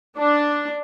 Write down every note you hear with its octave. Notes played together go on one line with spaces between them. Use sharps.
D4